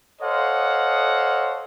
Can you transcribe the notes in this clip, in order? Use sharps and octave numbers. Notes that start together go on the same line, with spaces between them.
A4 C5 C#5 D#5 F5 F#5